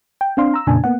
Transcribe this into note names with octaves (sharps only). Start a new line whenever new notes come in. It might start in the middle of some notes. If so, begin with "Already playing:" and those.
G5
C4 D4 F5 C6
A#5 E6
F2 A#2 C#3 D4 G#5 A5
A#3 B3 F#5